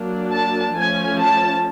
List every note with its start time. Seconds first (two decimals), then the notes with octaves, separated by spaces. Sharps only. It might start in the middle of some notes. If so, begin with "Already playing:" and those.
Already playing: F#3 A#3 D4
0.33 A5
0.76 F3 A3 C#4 G#5
1.20 A5